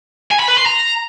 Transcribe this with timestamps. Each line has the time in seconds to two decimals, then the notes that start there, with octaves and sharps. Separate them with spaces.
0.31 G#5
0.40 B5
0.49 B4
0.57 C6
0.66 A#5